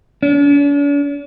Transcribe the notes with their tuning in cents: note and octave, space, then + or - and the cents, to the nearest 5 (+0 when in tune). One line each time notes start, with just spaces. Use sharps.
D4 -45